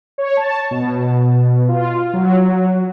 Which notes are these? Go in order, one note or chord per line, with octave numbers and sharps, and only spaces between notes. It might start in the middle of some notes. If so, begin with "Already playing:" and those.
C#5
A5
B2
F4
F#3